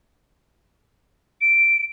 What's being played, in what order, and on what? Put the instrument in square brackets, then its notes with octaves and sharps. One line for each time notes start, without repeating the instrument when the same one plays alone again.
[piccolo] D7